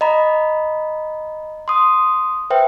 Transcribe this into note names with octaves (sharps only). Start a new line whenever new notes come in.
D#5 A#5 B5
C6 D#6
B4 C5 E5 G5